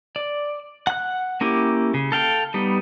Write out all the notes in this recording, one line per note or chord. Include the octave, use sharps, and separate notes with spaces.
D5
F#5 F#6
A#3 C#4 E4 G4
C#3
A4 F5 G5
G3 B3 D#4